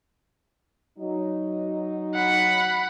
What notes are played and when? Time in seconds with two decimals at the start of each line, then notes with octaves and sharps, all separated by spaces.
0.98 F#3 D#4
2.15 F#5 B5